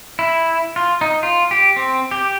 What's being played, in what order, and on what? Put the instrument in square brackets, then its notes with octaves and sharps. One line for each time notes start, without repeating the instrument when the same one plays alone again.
[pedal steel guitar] E4
F4
D#4
F4
G4
C4
G4